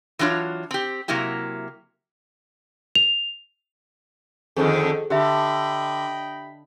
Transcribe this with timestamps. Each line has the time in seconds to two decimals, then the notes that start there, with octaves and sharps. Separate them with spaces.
0.19 E3 F#3 D4 F4 C#5
0.71 C4 G4
1.08 C3 F#3 A#3 E4 G4
2.95 F7
4.57 F2 D3 D#3 G#4 A4 C5
5.10 D3 G4 D#5 E5 G5 B5